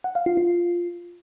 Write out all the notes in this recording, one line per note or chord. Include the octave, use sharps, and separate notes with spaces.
F#5
F5
F4
F4